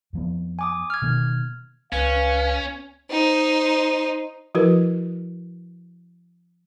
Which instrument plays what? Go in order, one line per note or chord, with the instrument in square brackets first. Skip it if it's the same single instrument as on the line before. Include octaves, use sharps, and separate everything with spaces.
[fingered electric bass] F2 F3 B3
[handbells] G#5 D6 D#6
F6 G#6
[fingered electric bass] B2 D#3 A#3
[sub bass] C#2 [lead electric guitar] C#4 [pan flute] B4 [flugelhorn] F5
[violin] D#4 C5
[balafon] F3 E4 F#4 A#4 B4